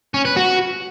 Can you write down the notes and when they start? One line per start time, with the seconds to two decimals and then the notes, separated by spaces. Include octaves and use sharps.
0.14 C#4
0.25 B4
0.36 F#4